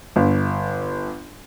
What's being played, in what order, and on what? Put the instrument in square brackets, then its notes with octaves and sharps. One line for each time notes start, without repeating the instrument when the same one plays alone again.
[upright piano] G1